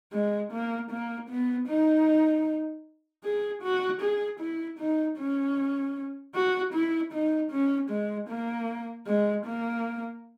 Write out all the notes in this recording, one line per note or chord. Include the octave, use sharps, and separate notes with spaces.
G#3
A#3
A#3
B3
D#4
G#4
F#4
G#4
E4
D#4
C#4
F#4
E4
D#4
C#4
G#3
A#3
G#3
A#3